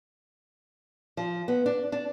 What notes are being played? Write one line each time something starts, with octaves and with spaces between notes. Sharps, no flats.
F3
B3
D4
D4